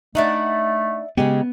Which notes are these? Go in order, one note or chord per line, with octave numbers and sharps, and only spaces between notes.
A3 D4 D#4 D5 E5 F#5
C#3 G#3 B3 G4